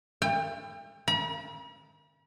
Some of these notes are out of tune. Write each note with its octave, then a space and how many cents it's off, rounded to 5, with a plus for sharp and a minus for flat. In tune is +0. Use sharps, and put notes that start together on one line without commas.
G5 +35
B5 -45